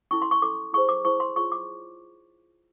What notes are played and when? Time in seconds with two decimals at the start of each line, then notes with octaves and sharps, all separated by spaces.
0.11 C#4 E4 A4 C#6
0.22 C6
0.31 C#6
0.42 C#4 E4 A4 D6
0.73 E4 G#4 C5 C#6
0.89 D6
1.05 E4 G#4 C5 C#6
1.20 C6
1.36 F4 G#4 C#5 C#6
1.52 D6